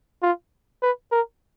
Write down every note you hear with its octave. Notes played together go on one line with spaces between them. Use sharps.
F4
B4
A#4